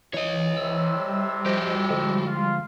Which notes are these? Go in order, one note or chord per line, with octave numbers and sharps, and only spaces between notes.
E3 C#5 D#5
A2 C3 E6
G3
F3 F#4 G4 C5 D#5
D3 F3 G#3
F4